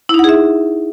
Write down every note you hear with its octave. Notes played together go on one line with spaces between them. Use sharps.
D#4 E4 G#4 E5 F#5